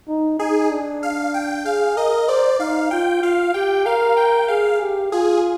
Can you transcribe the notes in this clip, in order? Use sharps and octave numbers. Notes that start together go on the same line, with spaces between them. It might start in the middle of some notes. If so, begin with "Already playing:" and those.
D#4
D#4 G#4
D4
F5
G5
G#4 F5
A#4 D#5
C5 D5
D#4 F5
F4 G5
F4 F5
G4 G5
A#4 F5
G5
G#4 F5
G4
F4 G#4